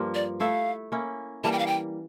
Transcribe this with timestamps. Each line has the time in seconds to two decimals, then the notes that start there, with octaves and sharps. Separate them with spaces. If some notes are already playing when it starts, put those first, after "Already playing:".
Already playing: G2 F3 A#3
0.14 D5
0.40 A3 E4 A4 E5 F5
0.92 A#3 C#4 E4
1.44 E3 G3 A#3 A5
1.52 G5
1.59 F5
1.67 G5